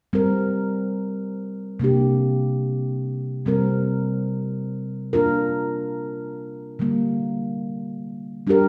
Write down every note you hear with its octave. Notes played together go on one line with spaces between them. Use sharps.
G3 C4 A#4
C3 A#3 D4 G4
C3 G3 C4 A#4
A#3 D4 F4 A#4
D3 G3 A#3
G3 D4 G4 A#4